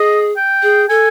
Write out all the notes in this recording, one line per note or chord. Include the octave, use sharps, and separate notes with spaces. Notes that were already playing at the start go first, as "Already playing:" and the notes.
Already playing: G#4 D#5
G5
G#4
A4 G#5